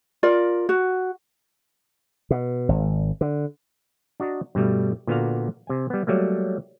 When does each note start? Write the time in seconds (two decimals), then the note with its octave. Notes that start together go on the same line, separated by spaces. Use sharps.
0.23 F4 A#4 D5
0.69 F#4
2.31 B2
2.69 G#1
3.21 D3
4.20 D4 F#4 D#5 A#5
4.55 G2 B2 G3 A3
5.07 A#2 D3 B3 F#4 F5 A#5
5.67 C3 G#5
5.90 G3 B3
6.07 F#3 G3 A3 A#3